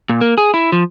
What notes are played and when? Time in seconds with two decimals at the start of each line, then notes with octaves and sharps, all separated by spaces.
0.09 A#2
0.21 A#3
0.38 G#4
0.54 E4
0.72 F3